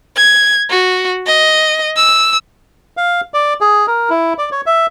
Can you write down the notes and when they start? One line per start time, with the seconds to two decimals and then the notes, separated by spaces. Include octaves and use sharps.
0.16 G#6
0.70 F#4
1.26 D#5
1.96 E6
2.97 F5
3.34 D5
3.61 G#4
3.87 A#4
4.10 E4
4.38 D5
4.52 C#5
4.66 E5